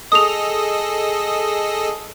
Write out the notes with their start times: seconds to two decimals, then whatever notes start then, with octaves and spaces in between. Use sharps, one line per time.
0.12 G#4 A4 D#5 D#6 F7